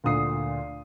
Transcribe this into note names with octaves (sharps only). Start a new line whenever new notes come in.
D2 A#2 D#6 C7